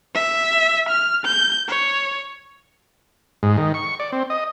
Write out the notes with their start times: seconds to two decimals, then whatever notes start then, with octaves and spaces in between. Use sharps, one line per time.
0.14 E5
0.89 F6
1.25 G6
1.68 C#5
3.43 G#2
3.57 D#3
3.74 C#6
4.00 D5
4.12 C4
4.30 D#5